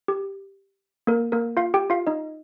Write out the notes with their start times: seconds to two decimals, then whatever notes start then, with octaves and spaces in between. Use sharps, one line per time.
0.08 G4
1.07 A#3 A#4
1.32 A#3 A#4
1.57 F4 F5
1.74 G4 G5
1.90 F4 F5
2.07 D#4 D#5